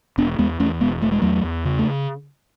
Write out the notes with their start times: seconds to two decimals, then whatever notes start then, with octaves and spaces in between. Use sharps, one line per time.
0.18 E1 B3 D4
0.38 E2 G#3 B3
0.60 E2 A3 C#4
0.81 E1 G#3 B3
1.02 E1 A3
1.12 G#3
1.22 E2 F#3 A3
1.44 E2
1.65 C#3
1.79 A3